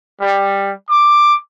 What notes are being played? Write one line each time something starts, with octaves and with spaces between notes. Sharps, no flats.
G3
D6